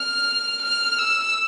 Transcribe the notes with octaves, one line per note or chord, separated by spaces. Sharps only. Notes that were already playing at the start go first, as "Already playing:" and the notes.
Already playing: F6
F6
E6